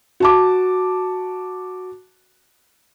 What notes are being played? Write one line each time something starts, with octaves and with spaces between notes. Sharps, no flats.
F#4 A5 D6